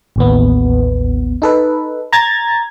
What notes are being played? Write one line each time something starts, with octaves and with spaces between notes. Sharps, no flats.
A1 D#2 B3
D#4 A4 B4
A#5 G#6 A6